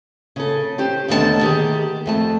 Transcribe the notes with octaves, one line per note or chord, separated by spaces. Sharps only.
C#3 A4
C#4 G4 C5
D#2 B2 D3 A3 A4 A5
D#3 G4 G#4
F2 A3 A5